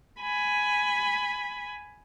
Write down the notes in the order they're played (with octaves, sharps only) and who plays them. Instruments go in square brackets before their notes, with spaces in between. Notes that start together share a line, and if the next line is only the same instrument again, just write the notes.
[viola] G#5 B5